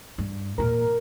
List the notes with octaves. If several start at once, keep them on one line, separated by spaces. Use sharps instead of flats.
G2
E2 A#2 A#4